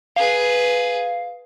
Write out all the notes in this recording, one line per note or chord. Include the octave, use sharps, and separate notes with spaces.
G#4 B4 F5